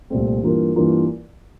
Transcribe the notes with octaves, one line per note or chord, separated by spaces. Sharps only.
C2 A#2 A3 C4
G2 E3 A#3 F4 A#4
G2 E3 A#3 F4 A#4